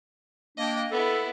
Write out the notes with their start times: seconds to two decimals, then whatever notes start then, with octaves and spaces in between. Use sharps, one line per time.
0.57 A#3 D4 D#5 G5
0.91 B3 E4 A4